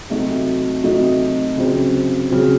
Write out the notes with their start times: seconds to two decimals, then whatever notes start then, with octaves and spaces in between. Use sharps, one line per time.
0.10 C3 F#3 A3 D#4 F#4
0.84 C3 F#3 A3 D#4 F#4
1.57 C#3 F#3 C4
2.31 C#3 F#3 C4